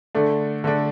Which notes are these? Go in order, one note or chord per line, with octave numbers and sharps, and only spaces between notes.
D3 A3 D4
D3 A3 D4